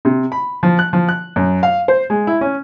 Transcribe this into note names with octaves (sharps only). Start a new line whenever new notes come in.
C3
B5
F3
F#6
F3
F#6
F#2
F5
C5
G#3
E4
C#4